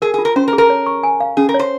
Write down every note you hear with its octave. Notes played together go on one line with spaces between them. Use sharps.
G#4 A#4
F4 G#4
A#4
C#4 C5
A#4
G#4
A#4
C#5
C#6
G#5
F5
C#4 G#4
A#4
C#5
C5